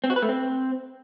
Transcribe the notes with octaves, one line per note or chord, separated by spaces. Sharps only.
C4
F#4
B4
A3
C4